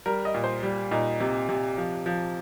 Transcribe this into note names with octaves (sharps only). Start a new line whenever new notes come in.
G3 A#4
D#5
A#2
C5
G3
A#2 D#4
C3
C3
F3
F3